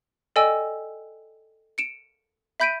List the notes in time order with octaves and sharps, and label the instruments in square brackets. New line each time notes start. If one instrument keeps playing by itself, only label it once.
[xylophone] A4 D5 D#5 G5 G#5 E6
C#7 D7 E7
E5 B5 G6 B6 D7 D#7